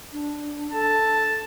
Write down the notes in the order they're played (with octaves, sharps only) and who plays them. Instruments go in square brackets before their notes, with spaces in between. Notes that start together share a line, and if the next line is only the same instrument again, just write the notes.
[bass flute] D4
[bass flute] A4 [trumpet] A5